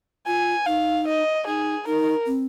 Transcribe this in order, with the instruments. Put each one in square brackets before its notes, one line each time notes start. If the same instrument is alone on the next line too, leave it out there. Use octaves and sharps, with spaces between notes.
[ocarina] F4 [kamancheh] G#5
[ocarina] D#4 [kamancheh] F5
[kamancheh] D#5
[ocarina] D#4 [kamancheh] G#4
[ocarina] D#4 [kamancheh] A#4
[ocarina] C4